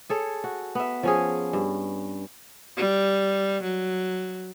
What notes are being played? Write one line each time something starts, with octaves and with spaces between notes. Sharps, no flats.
G#4 A4 C#5
F#4
B3 E5
F3 C#4 G#4
G2
G3
F#3